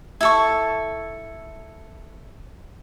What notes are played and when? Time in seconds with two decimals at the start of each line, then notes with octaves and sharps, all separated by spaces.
0.21 E4 A4 C#6